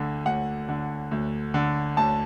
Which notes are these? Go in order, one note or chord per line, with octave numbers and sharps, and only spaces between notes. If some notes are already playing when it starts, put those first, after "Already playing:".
Already playing: D2 D3
D2 F#5
D3
D2
D3
D2 A5